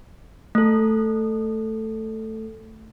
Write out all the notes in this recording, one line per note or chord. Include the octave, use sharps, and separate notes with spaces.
A3 A4